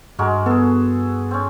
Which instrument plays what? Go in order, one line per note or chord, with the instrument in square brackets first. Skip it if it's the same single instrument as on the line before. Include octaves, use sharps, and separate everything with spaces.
[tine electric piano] G2 [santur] G#3 F#4 A#4
[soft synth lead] B3 [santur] G#4 A4
[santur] C4 C#4